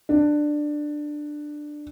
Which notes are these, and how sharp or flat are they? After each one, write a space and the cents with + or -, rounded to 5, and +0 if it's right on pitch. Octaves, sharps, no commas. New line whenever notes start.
D4 +15